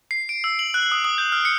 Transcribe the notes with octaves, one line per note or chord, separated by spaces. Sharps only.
C7
D7
E6
F#7
F#6
D#6
D#6
G6
F6
C#7